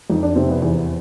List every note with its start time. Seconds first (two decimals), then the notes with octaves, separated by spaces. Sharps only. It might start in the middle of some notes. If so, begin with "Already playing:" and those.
0.10 F2 D#4
0.23 D4
0.36 C3 C4
0.49 B3
0.62 E2